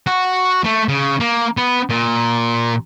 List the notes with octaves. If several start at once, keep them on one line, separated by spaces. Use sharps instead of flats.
F#4
A3
C#3
A#3
B3
A#2